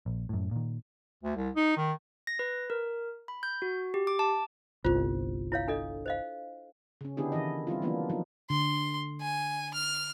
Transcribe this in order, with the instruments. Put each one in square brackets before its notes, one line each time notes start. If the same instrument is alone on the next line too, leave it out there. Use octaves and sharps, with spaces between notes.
[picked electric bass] A#1
F#2 A2
A#2 D#3
[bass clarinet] D2
C2
D#4
D#3
[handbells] A#6
B4
A#4
B5
G6
F#4
G4
D6
A5
[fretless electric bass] G1 C2 [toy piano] F4 C5
[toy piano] E4 C#5 F5
D4 A4 D#5
C5 D#5 F5
[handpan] C#3 C#4
D3 B3 D4 E4 G4 G#4
D#3 E3 E4 D#5
G3 C4 E4 F4
E3 F#3 A#3 B3 D4 F4
F3 F#3 B3 D#4 F4
[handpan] D3 [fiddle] C6
[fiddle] G#5
F6